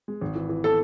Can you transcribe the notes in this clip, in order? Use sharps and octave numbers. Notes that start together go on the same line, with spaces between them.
G#3
G#1
E3
E3
B3 A4